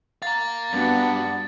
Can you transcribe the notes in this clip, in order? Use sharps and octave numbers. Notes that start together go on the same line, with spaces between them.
F5 A#5 A6
G2 B3 D4 F#4